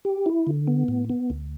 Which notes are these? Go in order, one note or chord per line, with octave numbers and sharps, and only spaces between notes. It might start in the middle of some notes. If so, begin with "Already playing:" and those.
G4
E4
D3
B3
A2
B3
D2